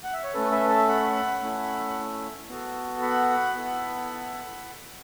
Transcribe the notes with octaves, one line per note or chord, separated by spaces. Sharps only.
F#5
E5
C#5
A3 C#4 A4 B4
B4 E5
E5 A5
F#5 B5
A3 C#4 E4
B3 F#4 A4
F#5 B5
B3 E4 A4